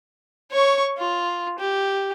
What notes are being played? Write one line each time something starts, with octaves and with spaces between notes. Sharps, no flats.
C#5 C#6
F4
G4